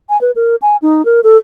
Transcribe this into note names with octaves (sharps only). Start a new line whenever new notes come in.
G#5
B4
A#4
G#5
D#4
A#4
A4